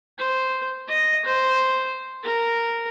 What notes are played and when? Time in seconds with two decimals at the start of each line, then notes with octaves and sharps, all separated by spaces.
0.18 C5
0.88 D#5
1.25 C5
2.23 A#4